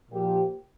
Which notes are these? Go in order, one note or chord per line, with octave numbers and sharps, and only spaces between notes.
A#2 F3 G4